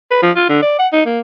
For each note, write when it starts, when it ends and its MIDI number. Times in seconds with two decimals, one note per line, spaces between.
0.11 0.21 71
0.23 0.31 53
0.36 0.45 65
0.49 0.61 50
0.62 0.77 74
0.79 0.87 78
0.93 1.02 63
1.06 1.20 58